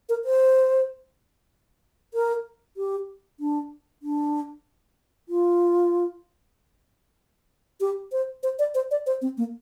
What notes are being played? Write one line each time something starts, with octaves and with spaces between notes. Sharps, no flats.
A#4
C5
A#4
G4
D4
D4
F4
G4
C5
C5
D5
C5
D5
C5
C4
A#3